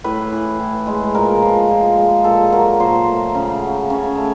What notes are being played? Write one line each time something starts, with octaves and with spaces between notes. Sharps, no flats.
A2 B4
E3
A2
G#3
A#2 A#4
F3
A#2
G#3
A#2 A4
F#3 A#4
A#2 C5
A3
C#3
F#3
C#3 C#5
A3